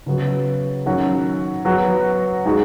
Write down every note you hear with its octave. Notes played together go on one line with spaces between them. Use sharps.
C#3 F#3 B3 F#4
D#3 F#3 C#4 F#4
F#3 B3 F#4
G#3 D#4 F#4